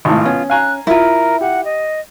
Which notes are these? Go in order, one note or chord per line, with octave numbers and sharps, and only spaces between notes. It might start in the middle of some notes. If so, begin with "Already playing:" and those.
G#1 A2 F4
B3 C#4
F5 G#5 A#5 F#6
E4 F4 A#4
G4 F#5
D#5